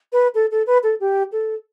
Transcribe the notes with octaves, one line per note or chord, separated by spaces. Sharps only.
B4
A4
A4
B4
A4
G4
A4